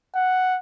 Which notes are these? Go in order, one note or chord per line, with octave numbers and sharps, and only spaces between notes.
F#5